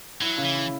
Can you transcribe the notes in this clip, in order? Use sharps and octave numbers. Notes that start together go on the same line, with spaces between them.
F#3 E4
C#3
E3
E4